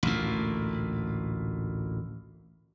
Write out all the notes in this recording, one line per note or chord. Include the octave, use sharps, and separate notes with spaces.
A1 D2 A#2